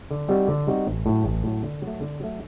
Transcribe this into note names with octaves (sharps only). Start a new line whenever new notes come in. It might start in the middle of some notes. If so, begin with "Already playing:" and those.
D3
G3 C4 D#4 F#4
D3
G3 C4 D#4 F#4
A1
A2 F#3
A1
A2 F#3
D3
F#3 A3
D3
F#3 A3